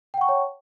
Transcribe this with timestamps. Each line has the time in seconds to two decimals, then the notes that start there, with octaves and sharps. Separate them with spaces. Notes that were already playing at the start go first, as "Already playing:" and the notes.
0.14 G5
0.18 F#5
0.21 C#6
0.25 A5
0.29 C#5